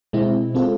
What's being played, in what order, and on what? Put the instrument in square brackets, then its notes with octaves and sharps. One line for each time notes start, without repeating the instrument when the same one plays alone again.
[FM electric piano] B2 G#3 C4 E4
G#3 C4 F4 A4